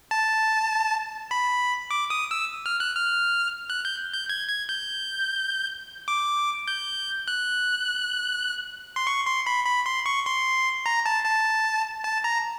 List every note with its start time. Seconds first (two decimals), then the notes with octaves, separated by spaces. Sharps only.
0.11 A5
1.31 B5
1.91 D6
2.10 D#6
2.31 E6
2.66 F6
2.80 F#6
2.95 F6
3.70 F#6
3.85 G6
4.14 G6
4.29 G#6
4.49 G#6
4.69 G6
6.08 D6
6.68 G6
7.28 F#6
8.96 C6
9.07 C#6
9.26 C6
9.46 B5
9.66 B5
9.86 C6
10.06 C#6
10.26 C6
10.86 A#5
11.06 A5
11.25 A5
12.04 A5
12.24 A#5